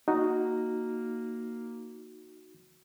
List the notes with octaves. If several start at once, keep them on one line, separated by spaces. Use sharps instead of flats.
A#3 D#4 F#4